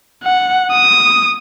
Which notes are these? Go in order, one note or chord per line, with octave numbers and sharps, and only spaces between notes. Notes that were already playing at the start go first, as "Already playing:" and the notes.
F#5
D#6